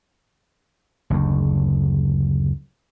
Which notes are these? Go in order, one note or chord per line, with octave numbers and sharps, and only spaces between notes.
F#1 D2